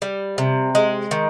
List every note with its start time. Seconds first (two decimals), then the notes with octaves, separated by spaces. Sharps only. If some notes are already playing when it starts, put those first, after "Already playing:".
0.02 G3
0.38 C3
0.75 G#3
1.11 D#3